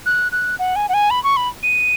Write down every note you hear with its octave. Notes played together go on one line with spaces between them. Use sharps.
F#6
F#6
F#5
G#5
F#5
G#5
B5
C#6
B5
D#7